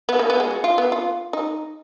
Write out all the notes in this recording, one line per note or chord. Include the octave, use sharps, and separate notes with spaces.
B3
A#3
B3
G#3
F#4
F4
B3
F4
D#4